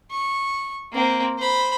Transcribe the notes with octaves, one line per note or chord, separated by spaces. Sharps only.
C#6
A#3 C4
C5 B5